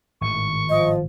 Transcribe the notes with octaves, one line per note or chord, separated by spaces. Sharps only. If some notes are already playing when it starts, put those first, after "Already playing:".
G#1 A2 D#3 C#6
F3 D#5